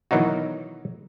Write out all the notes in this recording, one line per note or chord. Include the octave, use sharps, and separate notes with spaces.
B2 D#3 E3 F#3 D#4 F#4